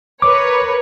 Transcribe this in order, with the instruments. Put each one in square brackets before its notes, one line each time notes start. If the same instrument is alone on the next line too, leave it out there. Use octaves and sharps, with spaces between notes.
[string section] A#4 B4 C#5 [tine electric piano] D6